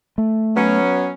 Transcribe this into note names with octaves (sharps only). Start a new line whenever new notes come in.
A3
F#3 B3 C#4